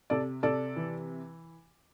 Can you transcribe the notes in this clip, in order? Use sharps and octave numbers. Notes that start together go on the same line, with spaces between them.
C3 A4 D5
C3 A4 D5
E3